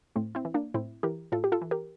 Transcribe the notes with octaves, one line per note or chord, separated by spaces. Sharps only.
A2 A3 C4
C4 E4
E3
A#3 D4
A2 C4 E4
E3 G4 A#4
A2 F4 A4
G4
F4 A4
E3
G4 A#4